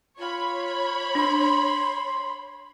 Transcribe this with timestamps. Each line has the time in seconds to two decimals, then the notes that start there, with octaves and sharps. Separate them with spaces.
0.18 F4 C#5 B5
1.15 D4 C6